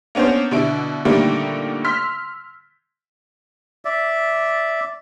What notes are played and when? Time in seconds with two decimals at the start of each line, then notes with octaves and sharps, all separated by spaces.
0.15 A#3 B3 C#4 D4 C5
0.51 B2 D3 E4 D7
1.05 A#2 D3 D#3 G3 A3 A#3
1.84 C6 E6 F6 B6
3.85 D5 E5